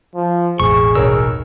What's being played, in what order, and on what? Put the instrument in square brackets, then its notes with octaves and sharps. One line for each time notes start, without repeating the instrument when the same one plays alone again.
[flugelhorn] F3
[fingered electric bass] E1 A1 [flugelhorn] G#4 [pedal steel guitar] C#6
[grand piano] B1 A#4 C#5 [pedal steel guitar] E6